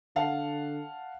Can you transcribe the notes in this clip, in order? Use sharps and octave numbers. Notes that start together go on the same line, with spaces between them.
D3 F5 F#5 A5